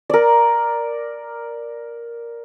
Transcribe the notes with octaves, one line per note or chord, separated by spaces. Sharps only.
A#4 D5